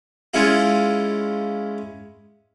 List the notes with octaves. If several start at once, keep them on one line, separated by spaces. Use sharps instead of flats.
G#3 C#4 E4 F4